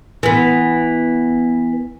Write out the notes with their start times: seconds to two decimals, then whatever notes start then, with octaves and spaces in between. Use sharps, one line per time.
0.23 E3 B3